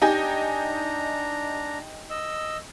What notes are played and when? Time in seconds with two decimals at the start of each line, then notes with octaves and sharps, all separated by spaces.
0.02 D4 D#4 G4 G#5 A#5
2.10 D#5 E6